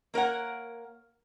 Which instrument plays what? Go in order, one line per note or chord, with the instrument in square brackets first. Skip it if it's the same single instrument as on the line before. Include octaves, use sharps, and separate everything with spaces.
[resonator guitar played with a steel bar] A#3 A#4 C#5 F#5